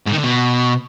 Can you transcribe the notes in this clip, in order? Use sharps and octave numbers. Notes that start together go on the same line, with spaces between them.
G#2
D#3
D3
B2